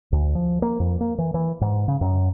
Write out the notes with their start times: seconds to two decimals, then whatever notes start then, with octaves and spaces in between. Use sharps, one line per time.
0.12 D2
0.35 F3
0.62 A#3
0.80 F2
1.01 A#3
1.18 E3
1.34 E3
1.61 G#2
1.88 C#3
2.01 F#2